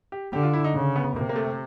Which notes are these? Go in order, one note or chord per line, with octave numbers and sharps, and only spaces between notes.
G4
D3 G4
F4
E4
D#4
C#3
B3
C3 A#3
A#3
A3